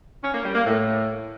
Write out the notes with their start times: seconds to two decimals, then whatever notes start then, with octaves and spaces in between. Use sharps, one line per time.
0.23 C#4
0.33 A#3
0.44 G3
0.54 A#3
0.65 A2